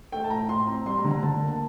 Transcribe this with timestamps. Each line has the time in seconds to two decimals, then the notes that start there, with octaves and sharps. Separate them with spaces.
0.12 A3 G5
0.24 A5
0.30 A2 A#5
0.49 A2 C6
0.67 C4 A#5
0.86 G3 C6
0.98 A#5
1.04 D3
1.11 A#5
1.23 D3 A5
1.41 A#3
1.52 A5